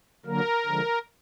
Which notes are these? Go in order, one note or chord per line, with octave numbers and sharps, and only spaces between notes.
D3 F#3 A#3 A#4
D3 F3 G#3